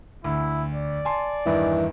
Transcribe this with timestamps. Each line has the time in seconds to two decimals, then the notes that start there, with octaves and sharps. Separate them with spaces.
0.24 D2 E4
0.72 D5
1.05 G#5 A5 C6
1.46 E2 G2 D#3 E3